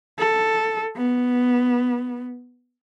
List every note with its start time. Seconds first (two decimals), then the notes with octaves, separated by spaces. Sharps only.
0.19 A4
0.96 B3